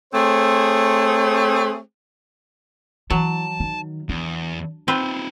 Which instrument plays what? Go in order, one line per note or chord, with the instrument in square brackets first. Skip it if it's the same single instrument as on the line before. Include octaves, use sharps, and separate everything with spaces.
[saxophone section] A3 C4 G#4 C5 C#5
[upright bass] E3 [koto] F#3 [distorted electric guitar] A5
[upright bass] D#3
[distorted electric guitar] E2 [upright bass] D4
[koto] C4 B4 [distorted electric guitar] D#4 F4